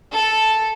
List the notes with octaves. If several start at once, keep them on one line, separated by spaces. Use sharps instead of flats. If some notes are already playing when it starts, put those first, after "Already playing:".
A4